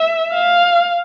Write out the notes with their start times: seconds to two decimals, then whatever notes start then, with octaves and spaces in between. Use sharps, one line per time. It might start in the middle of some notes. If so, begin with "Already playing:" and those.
Already playing: E5
0.34 F5